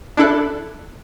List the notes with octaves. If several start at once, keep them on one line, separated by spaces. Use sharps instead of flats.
D4 E4 A4 F#6